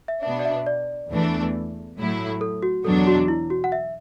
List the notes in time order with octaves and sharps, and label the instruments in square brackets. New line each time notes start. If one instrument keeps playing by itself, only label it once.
[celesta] E5
[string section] B2 B3 D4 [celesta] E5
[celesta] D5
E5
D5
[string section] E2 E3 A3 D4
A2 F#3 A3 E4
[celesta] A4
F#4
[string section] E2 B2 F#3 D4 [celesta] A4
[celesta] F#4
E4
F#4
F#5
E5